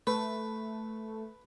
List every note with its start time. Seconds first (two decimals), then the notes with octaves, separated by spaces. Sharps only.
0.07 A3 B4